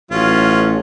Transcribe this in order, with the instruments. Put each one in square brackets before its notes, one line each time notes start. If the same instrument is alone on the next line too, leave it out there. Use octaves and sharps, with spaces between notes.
[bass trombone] A1 [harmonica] F#3 C#4 F4